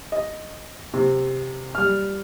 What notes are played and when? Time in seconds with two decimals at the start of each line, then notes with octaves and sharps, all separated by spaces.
0.12 D#5
0.94 C3
1.75 G3 F6